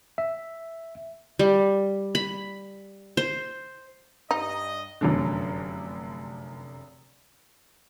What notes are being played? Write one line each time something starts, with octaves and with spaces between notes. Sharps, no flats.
E5
G3
B5
C5
G2 D#4 D#5
F1 F#2 D3